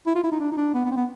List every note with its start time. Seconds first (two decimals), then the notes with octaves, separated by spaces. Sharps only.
0.06 E4
0.15 F4
0.24 E4
0.32 D#4
0.40 D4
0.52 D#4
0.57 D4
0.74 B3
0.85 B3
0.91 C4
0.97 B3